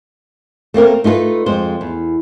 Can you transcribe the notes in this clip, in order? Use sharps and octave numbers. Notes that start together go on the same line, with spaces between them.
A3 A#3 C4 A#4
A3 D#4 F4 G#4 B4
F2 G#3 C5
E2